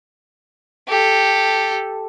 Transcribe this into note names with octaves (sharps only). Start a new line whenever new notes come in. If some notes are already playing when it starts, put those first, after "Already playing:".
G4 A4